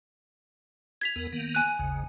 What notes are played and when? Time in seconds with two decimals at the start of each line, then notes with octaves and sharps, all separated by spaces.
1.01 G#6 B6 F7
1.16 E2 B3 A#4
1.32 D#3 A#3 B3
1.55 G#5 F#6
1.79 G#1 D#2 C#3